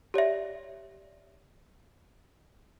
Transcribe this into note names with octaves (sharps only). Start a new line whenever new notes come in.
G4 C#5 D5 E5